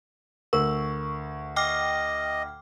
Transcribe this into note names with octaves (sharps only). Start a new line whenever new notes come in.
D2 A#4 C#6
D#5 G5 D6 F6